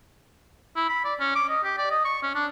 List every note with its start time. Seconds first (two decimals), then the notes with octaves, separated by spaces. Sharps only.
0.76 E4
0.89 B5
1.04 D5
1.20 C#4
1.35 D6
1.49 D#5
1.64 G4
1.78 D5
1.90 D#5
2.05 C#6
2.23 C#4
2.35 D4